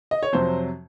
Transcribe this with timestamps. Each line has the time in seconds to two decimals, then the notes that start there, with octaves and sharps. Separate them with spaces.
0.11 D#5
0.23 C#5
0.32 F2 C3 F#3 C5